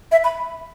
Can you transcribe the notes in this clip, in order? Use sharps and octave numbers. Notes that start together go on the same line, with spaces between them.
E5
B5